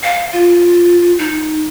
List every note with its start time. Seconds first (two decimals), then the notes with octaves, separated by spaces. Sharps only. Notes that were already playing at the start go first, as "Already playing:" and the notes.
0.03 F5
0.33 F4
1.19 D#4